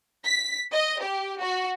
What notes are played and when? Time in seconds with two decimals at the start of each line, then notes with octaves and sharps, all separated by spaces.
0.25 B6
0.72 D#5
1.02 G4
1.41 F#4